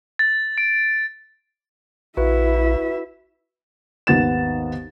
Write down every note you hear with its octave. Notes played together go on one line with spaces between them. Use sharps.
A6
D7
A#1 E4 F#4 B4 E5
G#1 D#2 B3 A6 E7